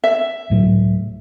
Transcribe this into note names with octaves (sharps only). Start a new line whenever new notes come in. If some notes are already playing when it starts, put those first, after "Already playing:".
E5
C#2 A2 F#3